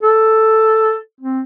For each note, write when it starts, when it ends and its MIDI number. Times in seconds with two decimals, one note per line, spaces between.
0.03 0.95 69
1.21 1.42 60